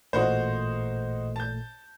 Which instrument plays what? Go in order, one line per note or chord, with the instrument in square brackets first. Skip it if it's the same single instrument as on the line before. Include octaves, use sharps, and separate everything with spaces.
[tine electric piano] A1 A#2 A3 [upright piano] D#4 F#4 C5
[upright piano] A5 G6